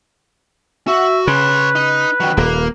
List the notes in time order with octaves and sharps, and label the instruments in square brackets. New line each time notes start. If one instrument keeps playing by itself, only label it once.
[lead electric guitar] F#4 [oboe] E5
[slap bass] C#3 [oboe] B4 [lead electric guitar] C#5 C6
[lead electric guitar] D#4
D#3 F#3
[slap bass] D#1 [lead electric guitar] A#3